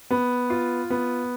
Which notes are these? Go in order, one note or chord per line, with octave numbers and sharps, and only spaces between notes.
B3
F4
B3